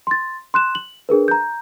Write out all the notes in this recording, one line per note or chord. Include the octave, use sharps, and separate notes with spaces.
C6 A6
C6 F#6 E7
F#7
D4 G#4 A#4 B4
A#5 G6